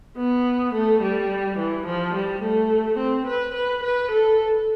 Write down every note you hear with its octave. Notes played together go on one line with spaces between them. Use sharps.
B3
A3
G3
E3
F3
G3
A3
C4
B4
B4
B4
A4